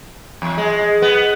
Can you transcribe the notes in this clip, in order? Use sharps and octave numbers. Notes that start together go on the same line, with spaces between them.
E2
G#3
B3